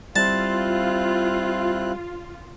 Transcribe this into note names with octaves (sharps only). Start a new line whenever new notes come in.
G3 C4 E4 F4 A5 F#6